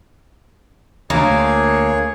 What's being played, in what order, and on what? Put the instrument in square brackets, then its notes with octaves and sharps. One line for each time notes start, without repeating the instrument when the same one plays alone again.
[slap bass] D2 [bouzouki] A#3 [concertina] G#4 C#5